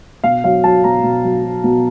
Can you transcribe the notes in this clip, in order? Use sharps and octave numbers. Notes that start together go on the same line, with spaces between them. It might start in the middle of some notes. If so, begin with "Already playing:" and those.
B2 F5
F#3 F5
F#3 A5
B2 A#5
B2
F#3
F#3
B2